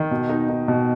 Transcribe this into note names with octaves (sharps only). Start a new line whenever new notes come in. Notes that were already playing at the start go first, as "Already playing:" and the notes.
Already playing: D#3
B2
D#4
D#4
B2